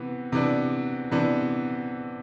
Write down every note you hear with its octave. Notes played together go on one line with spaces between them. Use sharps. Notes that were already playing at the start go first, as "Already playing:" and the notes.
Already playing: C3 E3 B3
C3 E3 B3 D4
C3 E3 B3 D4